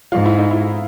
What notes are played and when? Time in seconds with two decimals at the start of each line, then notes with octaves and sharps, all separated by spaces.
0.12 G#2 F4
0.26 E4
0.38 D#4
0.51 E4